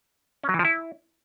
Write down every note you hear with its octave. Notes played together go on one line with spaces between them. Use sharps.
C#4
F#3
E3
F3
E4